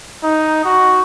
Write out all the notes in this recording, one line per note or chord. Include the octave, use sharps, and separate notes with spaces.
D#4
F#4